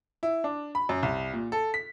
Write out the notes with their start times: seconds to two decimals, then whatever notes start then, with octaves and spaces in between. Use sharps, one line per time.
0.23 E4
0.44 D4
0.75 B5
0.89 F#2
1.03 C2
1.33 A#2
1.52 A4
1.74 B6